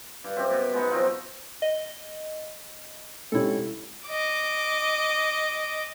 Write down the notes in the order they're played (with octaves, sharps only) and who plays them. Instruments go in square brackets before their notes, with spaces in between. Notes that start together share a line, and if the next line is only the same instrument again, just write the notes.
[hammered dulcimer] G2
F#2 C4 G4
B2
G#3 B3 D#4
F3 F#3 C4 F4
[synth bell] D#5
[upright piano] G#2 C3 C#4 [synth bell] E4 A4
[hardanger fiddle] D#5 D6